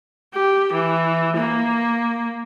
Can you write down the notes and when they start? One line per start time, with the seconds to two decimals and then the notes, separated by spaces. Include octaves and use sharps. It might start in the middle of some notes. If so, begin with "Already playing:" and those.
0.34 G4
0.73 E3
1.36 A#3